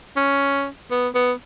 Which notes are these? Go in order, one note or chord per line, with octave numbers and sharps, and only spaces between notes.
C#4
B3
B3